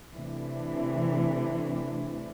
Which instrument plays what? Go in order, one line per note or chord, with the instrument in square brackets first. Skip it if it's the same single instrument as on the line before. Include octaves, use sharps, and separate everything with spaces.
[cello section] C3 E3 A3 D4